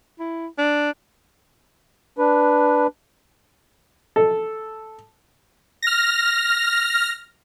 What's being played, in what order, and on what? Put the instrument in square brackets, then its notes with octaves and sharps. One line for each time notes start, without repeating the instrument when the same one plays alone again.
[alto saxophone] E4
D4
[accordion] D4 B4
[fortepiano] A4
[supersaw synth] F6 A#6